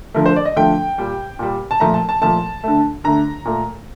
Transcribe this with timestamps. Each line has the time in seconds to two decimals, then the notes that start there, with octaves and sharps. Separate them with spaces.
0.14 D3 F3 A3 A#4
0.26 C5
0.36 D5
0.45 D#5
0.56 D3 F3 A3 G5
0.98 A#2 G3
1.39 A#2 G3
1.71 A5
1.80 A#2 F3 A3 A#5
1.94 A5
2.09 A5
2.21 A#2 F3 A3 A5
2.64 D3 A3
3.04 D3 A3 A#5
3.45 A#2 A3